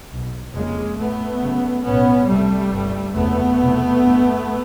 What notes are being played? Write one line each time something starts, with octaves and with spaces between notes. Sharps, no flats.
B1 B2
F1 F2 C#3 G#3 A#3
A1 A2 A3 B3
F#1 F#2 C#3
B1 A2 B3 C#4
C2 C3 G3 A3
G1 G2
F#1 E2 C3 A3 B3
F1 E2 B2
G1 G2